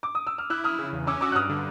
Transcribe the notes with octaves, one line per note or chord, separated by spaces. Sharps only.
D6
D#6
E6
F6
E4 E6 F#6
E4 D#6 F6
C#3
E2
C#4 D6 E6
F#4 D6 E6
F#6
G2 D#6 F6
D3